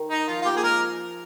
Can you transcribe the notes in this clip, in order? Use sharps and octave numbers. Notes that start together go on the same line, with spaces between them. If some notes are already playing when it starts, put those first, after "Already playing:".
Already playing: D#3
D#4
F3 F4
F4
A#3 G4
G#4
G#3 A#4